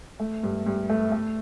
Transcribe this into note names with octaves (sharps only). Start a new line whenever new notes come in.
A3
G2
G2
A3
A3